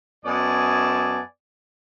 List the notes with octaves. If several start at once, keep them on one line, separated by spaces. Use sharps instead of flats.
F#2 B3 D5 D#5 G#5 A5